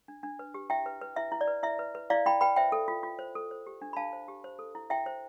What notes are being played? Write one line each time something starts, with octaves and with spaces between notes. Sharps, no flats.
D4
D4
B4
G4
E4 E5 G5
B4
B4
E4 E5
E4
D5
B4
E4 E5
B4
B4
E4 D5 F5
E4 G5 B5
B4 G5 B5
C5 E5 G5
A4
F4
F4
C5
A4
C5
G4
D4
B5
D4 F5 A5
C5
G4
C5
A4
E4
E4 E5 G5
C5